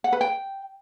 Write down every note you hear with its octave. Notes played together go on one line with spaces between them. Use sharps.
F#5
B4
G5